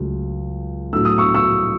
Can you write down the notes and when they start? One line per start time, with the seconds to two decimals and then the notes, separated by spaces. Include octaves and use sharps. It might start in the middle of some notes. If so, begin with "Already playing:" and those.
Already playing: C#2 C#3 F#3 A3
0.93 A2 F#3 A3 E6
1.05 D#6
1.18 C#6 E6
1.34 C#6 E6